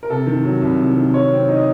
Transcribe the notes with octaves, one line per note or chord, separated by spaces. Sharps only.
A#4
C3 A4
D#3
F#3
C2
C3
D#3
F#3 C#5
C4
D#4
D#5